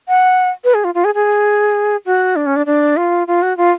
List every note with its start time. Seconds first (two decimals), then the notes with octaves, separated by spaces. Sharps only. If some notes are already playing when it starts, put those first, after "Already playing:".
0.09 F#5
0.64 B4
0.74 G#4
0.84 F4
0.95 F4
1.05 G#4
1.15 G#4
2.06 F#4
2.36 D4
2.46 C#4
2.56 D4
2.66 D4
2.97 F4
3.27 F4
3.42 F#4
3.57 F4